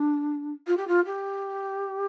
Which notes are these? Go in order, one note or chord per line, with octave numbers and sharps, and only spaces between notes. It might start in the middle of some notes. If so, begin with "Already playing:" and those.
Already playing: D4
F4
G4
F4
G4